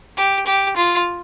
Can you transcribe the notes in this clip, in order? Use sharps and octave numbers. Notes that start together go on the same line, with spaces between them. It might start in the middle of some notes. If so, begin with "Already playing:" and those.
G4
G4
F4